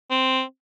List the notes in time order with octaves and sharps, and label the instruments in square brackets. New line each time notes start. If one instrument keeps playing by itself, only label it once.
[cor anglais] C4